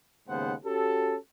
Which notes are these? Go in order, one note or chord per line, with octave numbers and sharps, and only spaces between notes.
D#2 G#2 C#3 B3 C5 F#5
C#4 F#4 G4 A4